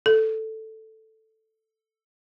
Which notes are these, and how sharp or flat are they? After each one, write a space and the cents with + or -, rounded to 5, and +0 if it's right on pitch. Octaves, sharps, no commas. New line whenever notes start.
A4 +5